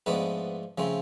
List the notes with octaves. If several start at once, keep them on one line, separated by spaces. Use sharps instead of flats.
G#2 F3 A3 B3 D4 B4
C#3 F3 A3 C4